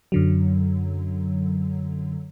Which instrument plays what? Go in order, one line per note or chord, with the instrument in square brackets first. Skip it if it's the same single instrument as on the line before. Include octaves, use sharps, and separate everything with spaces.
[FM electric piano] F#2 D3 F#3